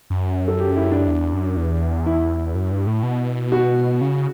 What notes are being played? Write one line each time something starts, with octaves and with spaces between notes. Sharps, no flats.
F#2
A4
G4
E4
D4
E2
F#2
E2
E4
F#2
G2
A2
B2
F#4
C#3